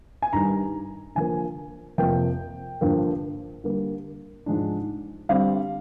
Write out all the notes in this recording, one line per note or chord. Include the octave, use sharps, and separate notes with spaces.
G#5
G2 D#3 G3 A#5
D3 F3 A#3 G#5
F2 C3 F3 A#3 G5
G2 D3 F3 A#3
D3 G3 A#3
G#2 F3 G#3 D4
D3 G3 C4 F5